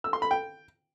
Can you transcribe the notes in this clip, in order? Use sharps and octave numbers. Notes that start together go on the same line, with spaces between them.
E6
C6
B5
G5